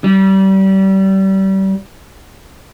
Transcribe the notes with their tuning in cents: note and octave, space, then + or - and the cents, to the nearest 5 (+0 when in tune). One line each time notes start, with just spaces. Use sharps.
G3 -30